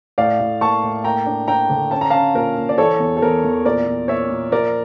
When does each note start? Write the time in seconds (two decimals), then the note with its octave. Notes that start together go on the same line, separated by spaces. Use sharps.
0.18 A2 D5 F5
0.40 A2
0.61 A#3 A5 C#6
0.83 A2
1.04 A#3 G5 A#5
1.26 D4
1.48 D4 G5 A#5
1.70 D3
1.91 C#4 A5
2.01 A#5
2.10 C#4 F5 A5
2.34 A#2 A#4
2.57 A#2
2.69 D5
2.78 E3 A4 C#5
2.99 E2
3.17 A4
3.22 E2 A#4
3.44 E2
3.65 A#2 A#4 D5
3.87 A#2
4.08 A#2 C#5 E5
4.30 A#2
4.52 F3 A#4 D5